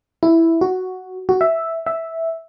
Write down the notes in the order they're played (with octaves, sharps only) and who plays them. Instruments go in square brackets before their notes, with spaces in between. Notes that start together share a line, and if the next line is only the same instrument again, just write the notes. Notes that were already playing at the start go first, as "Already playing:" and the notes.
[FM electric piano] E4
F#4
F#4
E5
E5